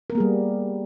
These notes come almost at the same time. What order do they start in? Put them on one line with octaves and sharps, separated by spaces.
A#4 B3 A#3 G#4 G3